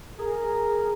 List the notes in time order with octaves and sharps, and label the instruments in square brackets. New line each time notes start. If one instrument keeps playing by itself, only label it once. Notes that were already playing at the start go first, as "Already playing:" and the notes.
[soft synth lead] G#4 [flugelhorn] A#4